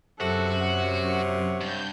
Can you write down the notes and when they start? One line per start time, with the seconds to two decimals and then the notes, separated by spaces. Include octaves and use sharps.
0.20 F#2 C3 F#4 A4 F#6
0.63 C#5 F#5
1.61 G2 G6